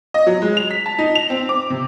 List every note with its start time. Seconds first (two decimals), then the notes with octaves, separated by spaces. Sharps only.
0.14 D#5
0.27 F#3
0.42 G#3
0.57 F7
0.71 B6
0.86 A5
0.98 D#4
1.15 F7
1.30 C4
1.49 D6
1.70 C3